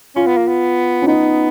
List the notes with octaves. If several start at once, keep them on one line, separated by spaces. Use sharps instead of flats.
C#4 F4
B3
A#3
B3
C#4
B3 D#4